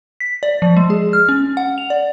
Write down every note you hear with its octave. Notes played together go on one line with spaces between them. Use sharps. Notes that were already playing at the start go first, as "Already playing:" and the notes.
B6
D5
F3
G#3
G#4
F6
C#4
F#5
F7
D5